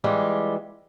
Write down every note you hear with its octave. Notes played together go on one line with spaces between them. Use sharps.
E3 G3 G#3 F4 G4